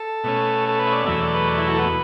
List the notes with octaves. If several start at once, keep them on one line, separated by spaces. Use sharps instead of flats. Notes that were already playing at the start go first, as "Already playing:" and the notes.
Already playing: A4
B2 A3 C#4
A4
B4
E5
D5
E2 B2 F#3 A3 E5
D5
B4
D5
E4
F#4
A4
B4